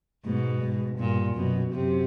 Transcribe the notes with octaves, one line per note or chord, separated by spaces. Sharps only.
G#2 B2
G#2
G2 A#2
F#2 B2
F#2 C3